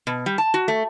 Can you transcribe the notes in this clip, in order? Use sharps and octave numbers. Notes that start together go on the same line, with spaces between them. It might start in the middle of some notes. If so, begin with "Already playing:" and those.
B2
G3
A5
F#4
A3